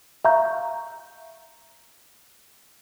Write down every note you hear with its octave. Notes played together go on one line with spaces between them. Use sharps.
E5 F5 A#5 C#6 G6